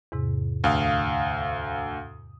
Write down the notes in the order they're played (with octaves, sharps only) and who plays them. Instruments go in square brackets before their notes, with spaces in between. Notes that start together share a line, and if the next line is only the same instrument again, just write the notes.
[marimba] E2 G#2 C3
[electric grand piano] D2 F5 D#6